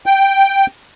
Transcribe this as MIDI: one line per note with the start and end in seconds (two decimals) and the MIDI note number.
0.06 0.66 79